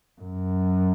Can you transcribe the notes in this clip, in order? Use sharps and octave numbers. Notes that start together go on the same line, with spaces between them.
F#2